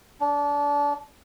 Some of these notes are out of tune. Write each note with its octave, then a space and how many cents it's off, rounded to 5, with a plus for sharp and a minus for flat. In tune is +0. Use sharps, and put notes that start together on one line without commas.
D4 -25